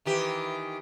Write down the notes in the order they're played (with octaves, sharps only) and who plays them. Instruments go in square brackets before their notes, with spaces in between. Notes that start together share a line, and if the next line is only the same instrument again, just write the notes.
[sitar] D#3 E3 G4